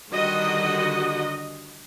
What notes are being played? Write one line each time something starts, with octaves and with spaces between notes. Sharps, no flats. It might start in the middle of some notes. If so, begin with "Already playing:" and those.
D3 D#3 G3 F#4 D#5